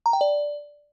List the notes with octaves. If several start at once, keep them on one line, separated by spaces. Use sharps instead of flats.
A#5
G5
D5